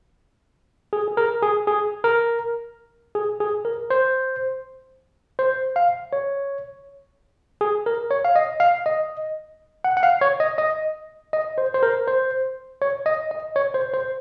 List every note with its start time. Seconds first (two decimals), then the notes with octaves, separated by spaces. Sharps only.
0.93 G#4
1.08 G#4
1.17 A#4
1.42 G#4
1.67 G#4
2.04 A#4
3.15 G#4
3.40 G#4
3.65 A#4
3.90 C5
5.39 C5
5.76 F5
6.13 C#5
7.61 G#4
7.86 A#4
8.11 C#5
8.25 F5
8.36 D#5
8.60 F5
8.86 D#5
9.84 F#5
9.97 F#5
10.03 F5
10.21 C#5
10.40 D#5
10.58 D#5
11.33 D#5
11.58 C5
11.74 C5
11.83 A#4
12.07 C5
12.82 C#5
13.06 D#5
13.31 D#5
13.56 C#5
13.74 C5
13.94 C5